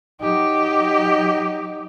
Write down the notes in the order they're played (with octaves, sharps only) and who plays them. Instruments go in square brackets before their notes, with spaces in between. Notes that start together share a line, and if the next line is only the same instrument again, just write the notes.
[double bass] F#3 D#4 [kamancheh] G4